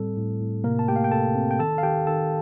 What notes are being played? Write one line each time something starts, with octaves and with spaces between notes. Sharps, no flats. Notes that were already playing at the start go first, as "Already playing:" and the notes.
Already playing: A2 G3 C4 A4
A2
A2
C3 A#3 A#4
A5
A3 G4 G5
F5
G5
C3 A4 A5
C4
G5
D#3 A4 A5
F5
D#3 G4 G5
D#3 A4 A5